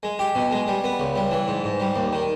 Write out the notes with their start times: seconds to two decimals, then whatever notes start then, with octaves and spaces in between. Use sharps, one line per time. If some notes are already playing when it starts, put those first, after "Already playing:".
0.03 G#3
0.19 G4
0.35 B2
0.51 G#3
0.68 G3
0.84 B3
1.00 C#2
1.16 G3
1.31 E3
1.48 G#2
1.64 G#2
1.80 G3
1.96 D#2
2.13 D#3